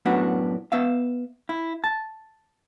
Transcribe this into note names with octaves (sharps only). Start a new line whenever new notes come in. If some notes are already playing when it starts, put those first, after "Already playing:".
F#2 A2 B3 D4 F#4
B3 E5 F5
E4
A5